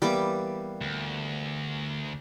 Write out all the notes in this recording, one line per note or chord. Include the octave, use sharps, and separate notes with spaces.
E3 G3 A#3 B3 D6
D2